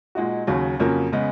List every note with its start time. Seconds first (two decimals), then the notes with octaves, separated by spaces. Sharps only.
0.15 A#2 G#3 D#4 F#4
0.47 D#2 C#3 F#3
0.79 F2 C#3 F#3 A#3 C#4
1.12 C#3 G#3 B3